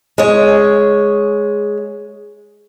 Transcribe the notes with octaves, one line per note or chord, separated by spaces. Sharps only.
G#3 C#5